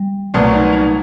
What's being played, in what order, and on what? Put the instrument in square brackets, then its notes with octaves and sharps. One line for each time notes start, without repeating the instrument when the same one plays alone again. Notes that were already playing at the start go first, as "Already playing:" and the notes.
Already playing: [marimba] G3
[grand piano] C2 A#2 F#3 B3 [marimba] A3
[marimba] D#4
D#4